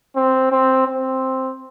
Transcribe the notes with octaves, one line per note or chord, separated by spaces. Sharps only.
C4
C4
C4